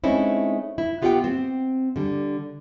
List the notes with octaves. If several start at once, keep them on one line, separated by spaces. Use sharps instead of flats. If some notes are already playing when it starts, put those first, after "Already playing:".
G#3 A3 C4 C#4 D#4 E4
E4
B3 F4 G4 B4 F#5 G5
C4
D3 G3